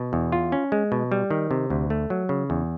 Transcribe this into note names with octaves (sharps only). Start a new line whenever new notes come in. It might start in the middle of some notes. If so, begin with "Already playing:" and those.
Already playing: B2
E2
F4
C#4
G#3
B2
G3
D#3
C3
D2
A3
F#3
C#3
E2